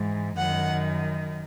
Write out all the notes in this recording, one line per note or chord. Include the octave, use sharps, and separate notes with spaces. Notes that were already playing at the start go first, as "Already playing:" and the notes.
Already playing: G#2 E3
F#2 D#3 F#5